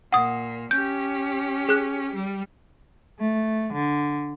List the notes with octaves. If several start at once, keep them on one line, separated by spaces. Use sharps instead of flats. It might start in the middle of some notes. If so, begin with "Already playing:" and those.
A#2 F#5 D#6
C#4 G4 G6
G#4 F#6
G3
A3
D3